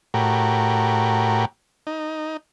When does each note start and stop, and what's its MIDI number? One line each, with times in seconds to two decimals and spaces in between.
0.14 1.45 45
0.14 1.45 66
0.14 1.45 67
0.14 1.45 70
1.87 2.37 63